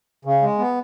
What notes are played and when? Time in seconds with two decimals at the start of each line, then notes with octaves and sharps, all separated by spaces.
0.25 C#3
0.42 G#3
0.59 B3